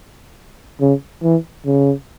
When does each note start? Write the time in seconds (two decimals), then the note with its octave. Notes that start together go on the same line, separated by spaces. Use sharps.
0.80 C#3
1.23 E3
1.66 C#3